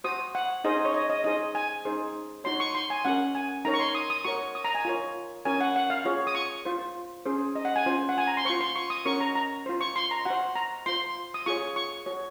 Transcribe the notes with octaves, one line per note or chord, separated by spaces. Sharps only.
F#4 C5 D#6
F#5
D#4 G#4 C5 D#5
C#5
D#5
D#5
D#4 G#4 C5 D#5
G#5
D#4 G#4 C5
D#4 F#4 C#5 C6
C#6
C6
G#5
C#4 F#4 A#4 F#5
G#5
D#4 A#4 C#5 A#5
C#6
C6
D#6
D#6
F#4 A#4 C#5 C#6
D#6
A#5
G#5
F4 A#4 C#5
C#4 F#4 A#4 C#5 G#5
F#5
F#5
F5
F4 G#4 C#5
D#6
C#6
F4 C5
C#4 G#4 C5
D#5
F#5
G#5
C#4 F4 C5
F#5
G#5
A#5
C6
F4 C5 C#6
C6
C#6
D#6
C#4 F#4 A#4 C#5 C#6
A#5
A#5
F4 C5
C#6
C6
A#5
F#4 C5 F#5
A#5
F4 C5 C6
D#6
F4 G#4 C#5 C#6
C#6
F#4 C#5